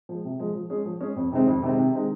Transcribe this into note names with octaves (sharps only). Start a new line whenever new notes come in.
F3 G#3
C3
F3 G#3
F3
G#3 C#4 G#4
F3
G#3 C#4 G#4
F2
C3 D#3 G#3 C4
F2
C3 D#3 G#3 C4
C3
D#3 G#3 C4 D#4